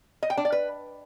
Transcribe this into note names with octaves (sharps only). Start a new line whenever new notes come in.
D#5
G5
D4
D5
B4